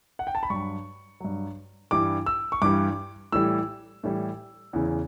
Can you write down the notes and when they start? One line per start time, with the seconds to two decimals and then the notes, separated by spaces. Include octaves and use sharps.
0.19 F#5
0.27 G5
0.35 A5
0.43 B5
0.50 G2 F#3 C#6
1.20 G2 F#3
1.91 G2 E3 G3 D6
2.26 E6
2.52 C#6
2.62 G2 E3 G3 D6
3.32 A2 E3 G3 E6
4.03 A2 E3 G3
4.73 E2 C#3 E3